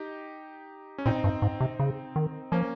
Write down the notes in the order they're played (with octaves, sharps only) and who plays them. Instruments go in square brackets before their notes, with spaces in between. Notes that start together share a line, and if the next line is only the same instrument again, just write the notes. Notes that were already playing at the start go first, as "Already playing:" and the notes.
Already playing: [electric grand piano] D#4 G4
C#4
[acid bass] A#2 [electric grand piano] C4 D#4
[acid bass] G2
G#2
C3
C#3
D#3
[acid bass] F3 [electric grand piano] A#3 C#4